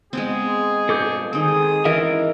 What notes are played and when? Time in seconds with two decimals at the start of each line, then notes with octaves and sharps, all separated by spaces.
0.13 G#3 B3 C4 G#4
0.89 G2 B2 F3 A4 D6 G6
1.33 D#3 C4 G#4 D#6
1.85 E2 G#2 C#3 E3 A#4 D#5 E5